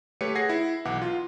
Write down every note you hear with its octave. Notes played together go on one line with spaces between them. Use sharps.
A3 G4 B4 C#5 C#7
G#4 F#5 G#6 A#6 C7
E4
B1 E3 F#5 D6
F4